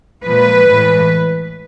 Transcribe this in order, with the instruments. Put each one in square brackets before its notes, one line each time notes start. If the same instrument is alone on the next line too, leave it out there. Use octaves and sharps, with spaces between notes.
[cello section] A#2 F3 G#3 B4
A2 E3 G#3